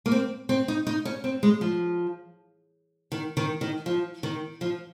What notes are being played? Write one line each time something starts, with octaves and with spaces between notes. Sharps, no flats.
A#3
C4
C4
D#4
D#4
C#4
C4
G#3
F3
D#3
D#3
D#3
F3
D#3
F3